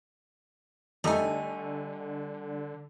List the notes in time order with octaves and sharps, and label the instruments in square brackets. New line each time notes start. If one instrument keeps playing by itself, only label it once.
[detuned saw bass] D3 [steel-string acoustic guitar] G3 G#5 [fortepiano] A3 D#4 A4